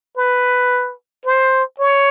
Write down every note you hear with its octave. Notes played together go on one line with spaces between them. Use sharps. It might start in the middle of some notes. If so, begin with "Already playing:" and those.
B4
C5
C#5